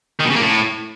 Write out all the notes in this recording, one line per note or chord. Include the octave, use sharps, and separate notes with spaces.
D#3
B2
C#3
A#3
A2